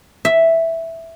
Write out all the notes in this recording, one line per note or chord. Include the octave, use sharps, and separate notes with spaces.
E5